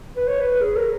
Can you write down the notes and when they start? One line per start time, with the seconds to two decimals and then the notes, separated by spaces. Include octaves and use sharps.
0.16 B4
0.28 C#5
0.40 B4
0.61 G#4
0.76 A#4